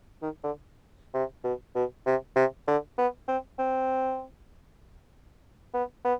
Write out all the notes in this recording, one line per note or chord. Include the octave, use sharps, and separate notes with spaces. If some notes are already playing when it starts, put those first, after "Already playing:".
D#3
D3
C3
B2
B2
C3
C3
D3
B3
C4
C4
B3
B3